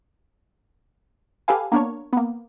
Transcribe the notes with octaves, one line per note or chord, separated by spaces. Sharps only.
G4 A4 B4 F5 G#5
A#3 B3 D4 A#4 C#5
A#3 B3